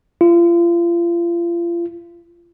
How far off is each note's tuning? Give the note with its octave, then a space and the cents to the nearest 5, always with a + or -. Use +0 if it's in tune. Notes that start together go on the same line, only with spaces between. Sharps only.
F4 -35